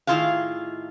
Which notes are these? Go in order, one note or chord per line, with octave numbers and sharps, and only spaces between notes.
A2 D#3 E4 F4 G#4 F5